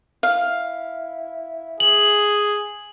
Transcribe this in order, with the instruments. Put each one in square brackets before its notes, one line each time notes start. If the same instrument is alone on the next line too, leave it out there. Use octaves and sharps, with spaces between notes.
[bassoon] E4 [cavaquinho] F5
[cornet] G#4 [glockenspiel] F#7